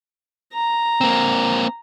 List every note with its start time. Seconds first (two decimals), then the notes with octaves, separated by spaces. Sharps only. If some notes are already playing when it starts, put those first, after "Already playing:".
0.53 A#5
1.01 A#3 C4